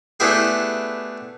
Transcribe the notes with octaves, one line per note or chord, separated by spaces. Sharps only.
A3 B3 D4 E4 G4 G#4